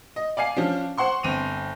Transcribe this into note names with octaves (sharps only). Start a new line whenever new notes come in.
D#5
D5 F5 G#5 C7
F3 C#4 D4
C5 F#5 C6 C#6
G1 C4 D#7 F7